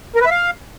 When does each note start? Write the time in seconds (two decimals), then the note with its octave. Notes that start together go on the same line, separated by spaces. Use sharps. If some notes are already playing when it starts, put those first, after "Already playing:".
0.16 A#4
0.21 B4
0.26 E5
0.31 F5